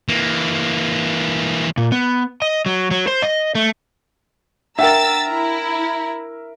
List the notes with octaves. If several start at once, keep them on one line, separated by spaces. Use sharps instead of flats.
E3 A#3
A#2
B3
D#5
F#3
F#3
C5
D#5
A3
D4 A#4 E5 F#5 G5 A#5 E6 A6
E4